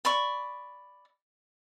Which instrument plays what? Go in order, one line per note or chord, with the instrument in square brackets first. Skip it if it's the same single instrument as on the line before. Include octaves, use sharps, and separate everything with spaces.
[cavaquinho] D5 B5 C#6